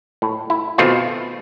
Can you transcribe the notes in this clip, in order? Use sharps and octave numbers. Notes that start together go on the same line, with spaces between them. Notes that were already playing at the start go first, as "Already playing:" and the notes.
A2
E4
B2 D#3 A3 C4 F4